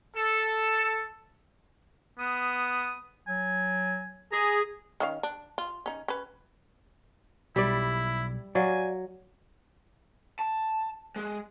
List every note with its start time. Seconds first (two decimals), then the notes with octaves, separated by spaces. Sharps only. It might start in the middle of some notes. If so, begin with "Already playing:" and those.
0.16 A4
2.19 B3 D#6
3.27 F#3 G#5
4.32 G#4 A#5
5.00 D#3 C#4 F5
5.23 D4
5.58 F4
5.86 C#4 D#4
6.08 C#4 B4
7.56 B1 G3 E4 D5
8.55 F#3 D5 F5 G#5
10.39 A5
11.16 G#3